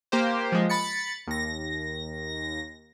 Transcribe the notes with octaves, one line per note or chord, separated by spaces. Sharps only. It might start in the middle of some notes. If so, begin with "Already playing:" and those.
A#3 G4 C5
F3 G#3
B5 A6 C#7
D#2 A#6